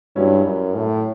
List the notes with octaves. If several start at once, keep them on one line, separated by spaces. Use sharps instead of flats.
G2 F#3 C#4 E4
F#2
A2